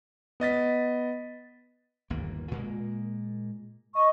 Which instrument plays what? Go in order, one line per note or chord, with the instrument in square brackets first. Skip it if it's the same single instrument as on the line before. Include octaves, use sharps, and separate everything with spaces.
[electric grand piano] B3 D#5 A6 B6
[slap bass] G1 D#2 A#3
A#2 G#3 A#3
[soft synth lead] D#5 [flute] C#6